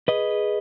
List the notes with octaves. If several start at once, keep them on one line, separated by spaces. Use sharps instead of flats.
G#4 B4 D#5
G#4